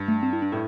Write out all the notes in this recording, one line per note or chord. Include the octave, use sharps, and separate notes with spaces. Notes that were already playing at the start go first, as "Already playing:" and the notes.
Already playing: G2
A3
C4
E4
D4
A2 E4